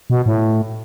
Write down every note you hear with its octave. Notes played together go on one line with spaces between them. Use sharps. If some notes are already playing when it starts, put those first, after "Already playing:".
B2
A2